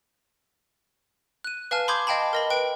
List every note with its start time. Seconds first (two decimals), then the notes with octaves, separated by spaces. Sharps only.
1.44 F#6 D#7
1.71 B4 F5 G#5 A5 F6
1.88 B5 C6 D6 D#6 G6 G#6
2.07 D#5 F5 G5 A5 B5
2.33 A#4 D#5 B5
2.50 B4 G5 D7